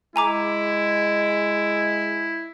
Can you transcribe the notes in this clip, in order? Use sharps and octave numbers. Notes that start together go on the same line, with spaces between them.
G#3 E4 G#5 A#5 D6